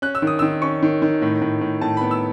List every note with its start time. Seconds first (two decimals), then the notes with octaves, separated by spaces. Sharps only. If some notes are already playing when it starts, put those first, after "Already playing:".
0.02 C#4 F#6
0.15 E6
0.22 D#3
0.27 D#6
0.39 E6
0.42 D#3
0.62 C#4 C#6
0.82 D#3
1.02 D#3
1.22 A2
1.42 A2
1.61 A2
1.81 A2 A5
1.97 B5
2.01 B3
2.11 E6